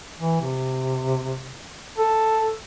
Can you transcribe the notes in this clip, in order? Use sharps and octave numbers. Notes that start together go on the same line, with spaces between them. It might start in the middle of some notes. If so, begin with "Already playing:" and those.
E3
C3
A4